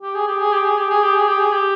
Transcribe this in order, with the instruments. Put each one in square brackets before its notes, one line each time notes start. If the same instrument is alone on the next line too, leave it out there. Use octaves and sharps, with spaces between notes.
[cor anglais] G4
G#4
G4
G#4
G4
G#4
G4
G#4
G4
G#4
G4
G#4
G4